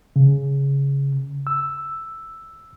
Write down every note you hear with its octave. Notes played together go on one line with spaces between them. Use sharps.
C#3
E6